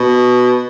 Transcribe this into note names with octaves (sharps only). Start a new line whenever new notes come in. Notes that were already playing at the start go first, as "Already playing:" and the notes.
Already playing: B2